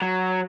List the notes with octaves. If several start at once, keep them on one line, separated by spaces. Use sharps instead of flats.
F#3